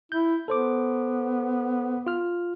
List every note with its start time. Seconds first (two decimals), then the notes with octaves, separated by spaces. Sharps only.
0.12 E4 G6
0.48 B3 A4 C5 D6
2.06 F4 F6